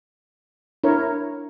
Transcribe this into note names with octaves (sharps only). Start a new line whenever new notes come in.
D4 E4 A#4 C#5